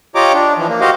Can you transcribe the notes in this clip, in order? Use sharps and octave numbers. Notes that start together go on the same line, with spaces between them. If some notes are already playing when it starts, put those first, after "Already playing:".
F4 G4 C#5 D#5 A#5 D6
D4
E3 F3
A#3
F#4 G4 C5 D#5 F5